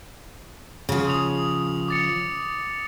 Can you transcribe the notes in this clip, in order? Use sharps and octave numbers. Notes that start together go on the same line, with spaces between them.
C#3 F3
D#6 F7
D6 A6 C#7